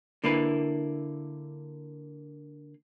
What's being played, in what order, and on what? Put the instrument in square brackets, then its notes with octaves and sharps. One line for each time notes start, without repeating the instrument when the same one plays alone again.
[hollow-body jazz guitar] D3 A#3 E4 B4